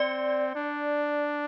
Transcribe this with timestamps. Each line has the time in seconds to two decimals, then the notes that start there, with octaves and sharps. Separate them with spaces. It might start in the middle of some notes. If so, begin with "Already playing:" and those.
Already playing: C4 D5
0.55 D4